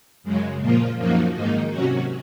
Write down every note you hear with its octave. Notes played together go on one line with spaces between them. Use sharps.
F#2 C#3 G#3
A#2 F3 A#3 F4
F#2 F3 A#3 D#4 F#4
G#2 D#3 A#3 D#4
C3 F#3 C#4 F#4